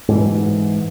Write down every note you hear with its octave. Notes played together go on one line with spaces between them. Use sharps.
G#2 E3